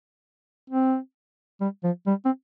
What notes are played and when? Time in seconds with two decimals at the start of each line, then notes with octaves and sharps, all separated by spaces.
0.70 C4
1.61 G3
1.84 F3
2.07 G3
2.25 C4